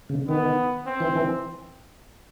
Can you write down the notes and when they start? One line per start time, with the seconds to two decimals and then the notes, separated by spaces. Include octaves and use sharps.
0.09 C#3
0.28 D#3 B3
0.86 C4
1.00 E3
1.15 E3